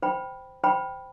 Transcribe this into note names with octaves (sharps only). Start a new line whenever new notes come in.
C5 G5 B5
C5 G5 B5